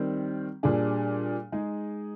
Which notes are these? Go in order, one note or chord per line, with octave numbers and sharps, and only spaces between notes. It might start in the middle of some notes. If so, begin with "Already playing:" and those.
Already playing: D#3 G3 C4
A#2 G3 D4 G#4
G#3 D#4 G#4